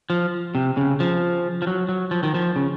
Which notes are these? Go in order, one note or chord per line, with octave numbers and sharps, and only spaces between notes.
F3
C3
C#3
F3
F3
F#3
F#3
F3
D#3
F3
C#3